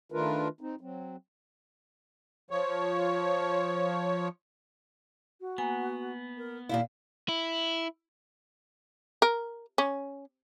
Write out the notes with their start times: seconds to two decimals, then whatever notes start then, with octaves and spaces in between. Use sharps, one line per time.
0.12 D#3 A3 D4 F4 A#4 B4
0.61 C4 D#4
0.81 F#3 C4
2.51 F3 C#5
5.40 F#4
5.58 A#3 B3 G#5
6.37 A#4
6.69 D#2 A#2 E4 F5
7.29 E4
9.22 A#4
9.78 C#4